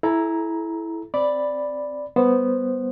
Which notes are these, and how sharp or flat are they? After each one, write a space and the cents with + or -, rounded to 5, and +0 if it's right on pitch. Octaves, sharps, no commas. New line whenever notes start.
E4 +0 A4 -35 A#5 +10
C4 +0 D5 +0 B5 +0
G3 +0 B3 +0 C5 +0